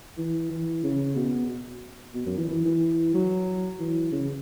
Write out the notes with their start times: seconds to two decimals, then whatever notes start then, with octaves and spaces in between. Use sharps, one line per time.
0.18 E3
0.50 E3
0.84 C#3
1.16 B2
2.15 B2
2.26 F#2
2.38 E3
2.48 E3
2.65 E3
3.14 F#3
3.80 E3
4.12 C#3